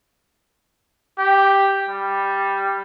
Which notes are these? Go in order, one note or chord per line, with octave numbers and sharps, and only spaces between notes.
G4
G3